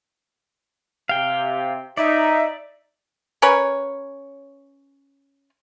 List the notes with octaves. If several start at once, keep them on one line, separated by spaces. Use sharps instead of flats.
C3 F5 G5
D#4 D5 E5
C#4 A#4 B4 C#5